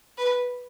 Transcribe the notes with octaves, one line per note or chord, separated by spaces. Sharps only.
B4